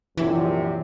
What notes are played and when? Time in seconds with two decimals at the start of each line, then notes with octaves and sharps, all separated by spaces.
0.17 A#1 F#2 C3 E3